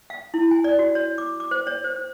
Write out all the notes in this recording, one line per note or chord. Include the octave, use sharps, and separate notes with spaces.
F5
E4
G#5
D5
F#4
C#5
D6
D6
C5
C#5
C5
C5